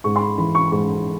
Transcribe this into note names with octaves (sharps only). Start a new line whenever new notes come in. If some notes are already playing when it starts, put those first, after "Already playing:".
G#2 C#6
C6
B5
E3 B5
C#6
G#2 C#6